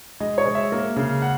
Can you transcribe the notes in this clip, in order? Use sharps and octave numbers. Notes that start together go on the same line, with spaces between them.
G#3 D#5
C#5
G#3
E5
A#3
C#3
F#5